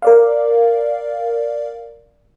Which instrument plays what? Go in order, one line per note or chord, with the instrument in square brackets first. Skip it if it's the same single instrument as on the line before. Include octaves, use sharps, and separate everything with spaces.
[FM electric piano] A#4 D5 F5